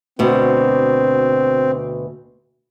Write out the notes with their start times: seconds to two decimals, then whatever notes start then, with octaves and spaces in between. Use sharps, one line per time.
0.19 D2 B2 C4